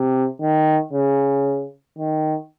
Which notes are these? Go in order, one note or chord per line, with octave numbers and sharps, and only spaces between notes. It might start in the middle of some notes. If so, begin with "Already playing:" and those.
Already playing: C3
D#3
C#3
D#3